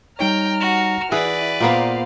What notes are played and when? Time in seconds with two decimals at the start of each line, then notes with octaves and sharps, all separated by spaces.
0.19 G3 D#4 C#5 G5 A#5 F6
0.61 F#4
1.12 E3 E4 G#4 B4 D5 F#5
1.60 A#2 A#3 B3 C5 F5